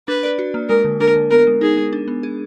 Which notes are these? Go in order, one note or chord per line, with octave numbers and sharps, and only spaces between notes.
D4 B4
D5
F#4
A#3
G#3 A#4
D3
D4 A#4
D3
B3 A#4
G#3
D#4 G#4
G#3
D4
B3
G#4